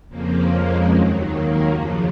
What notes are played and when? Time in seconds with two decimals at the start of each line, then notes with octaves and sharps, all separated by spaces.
0.09 F2 C#3 F3 A#3
0.49 G#3
0.90 D#2 D#3 F#3
1.30 A#3
1.71 F#2 C#3 F3